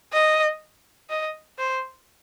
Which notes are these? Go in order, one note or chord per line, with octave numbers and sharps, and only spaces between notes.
D#5
D#5
C5